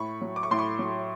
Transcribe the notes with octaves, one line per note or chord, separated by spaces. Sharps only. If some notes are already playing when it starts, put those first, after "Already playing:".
Already playing: A2 B5 C#6
F#3
D6
C#6
A2 C6
B5 C#6
F#3